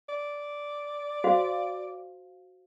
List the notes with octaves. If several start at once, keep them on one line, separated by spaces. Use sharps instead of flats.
D5
F#4 C5 F5